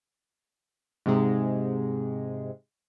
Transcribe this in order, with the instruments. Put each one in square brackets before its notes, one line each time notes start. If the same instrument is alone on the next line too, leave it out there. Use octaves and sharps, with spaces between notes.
[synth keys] G#2 C3 G#3